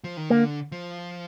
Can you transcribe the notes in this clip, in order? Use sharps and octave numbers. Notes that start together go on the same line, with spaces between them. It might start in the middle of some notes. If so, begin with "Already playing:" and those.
F3
D#3
D3 A#3
F3